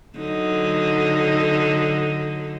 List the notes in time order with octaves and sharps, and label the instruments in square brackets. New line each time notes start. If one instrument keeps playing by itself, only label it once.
[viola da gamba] D3 F#3 D#4